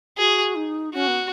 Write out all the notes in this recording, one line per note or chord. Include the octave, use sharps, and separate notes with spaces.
F#4 G#4
D#4
C#4 F#4
B3